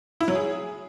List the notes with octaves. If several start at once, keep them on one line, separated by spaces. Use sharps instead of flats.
E4
F#3
G#4